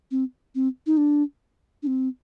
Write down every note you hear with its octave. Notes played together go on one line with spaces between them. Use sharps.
C4
C4
D#4
D4
D4
C4